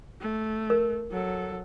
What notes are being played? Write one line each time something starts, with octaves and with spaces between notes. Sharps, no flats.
A3
A#4
F#3 A4